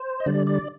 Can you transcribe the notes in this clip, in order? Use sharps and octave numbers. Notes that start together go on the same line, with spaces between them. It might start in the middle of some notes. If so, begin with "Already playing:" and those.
Already playing: C5
D#5
D3 G3 D5
D5